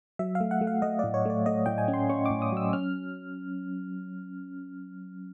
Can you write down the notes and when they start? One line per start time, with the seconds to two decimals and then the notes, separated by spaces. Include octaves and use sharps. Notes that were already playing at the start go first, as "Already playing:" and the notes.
0.19 F#3 E5
0.35 F5
0.40 A3
0.51 F#5
0.61 A3
0.67 F5
0.82 A3 D#5
0.99 A2 D5
1.14 C#5
1.25 A3 D5
1.46 A3 D#5
1.66 A2 G5
1.78 G#5
1.88 C#4
1.94 C6
2.09 C#4 C#6
2.26 A2 D6
2.42 D#6
2.52 F#3 E6
2.73 C#4 F6